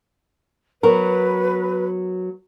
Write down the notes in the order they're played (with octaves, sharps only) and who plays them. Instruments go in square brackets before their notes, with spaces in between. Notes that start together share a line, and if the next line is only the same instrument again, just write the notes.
[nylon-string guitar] F#3 B3 A#4 [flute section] B4